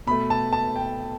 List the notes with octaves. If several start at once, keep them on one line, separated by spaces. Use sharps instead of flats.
B2 A3 B5
A5
A5
G5